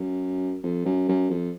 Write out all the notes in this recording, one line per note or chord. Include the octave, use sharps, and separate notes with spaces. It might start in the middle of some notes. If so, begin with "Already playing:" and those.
Already playing: F#2
F2
F#2
F#2
F2